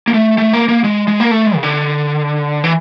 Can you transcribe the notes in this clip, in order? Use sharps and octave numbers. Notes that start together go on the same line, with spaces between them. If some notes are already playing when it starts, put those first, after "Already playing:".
A#3
A3
A3
A#3
A#3
G#3
G#3
A#3
A3
G#3
C#3
D3
E3